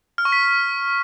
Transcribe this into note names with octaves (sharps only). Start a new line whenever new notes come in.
F6
C#6
B6